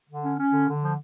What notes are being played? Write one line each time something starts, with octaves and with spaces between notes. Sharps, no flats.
D3
C#4
C#4
D3
D3
F3